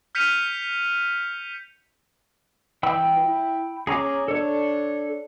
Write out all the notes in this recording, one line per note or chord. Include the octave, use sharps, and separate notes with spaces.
F6 G6 B6 C#7 D#7 F7
E3 G5 B5 E6
E4
C#4 G#4 A#5 D6
D4 A4 C#5